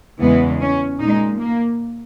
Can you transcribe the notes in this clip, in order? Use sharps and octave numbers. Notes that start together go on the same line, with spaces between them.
E2 C#3 E3 G#3 B3
C#4
A#2 G#3 D#4
A#3